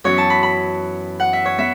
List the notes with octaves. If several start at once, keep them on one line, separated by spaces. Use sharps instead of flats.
F#2 E3 B3 C#5
A5
B5
B5
F#5
E5
C#5
B3 E5